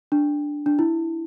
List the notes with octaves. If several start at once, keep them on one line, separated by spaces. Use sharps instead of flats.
D4
D4
E4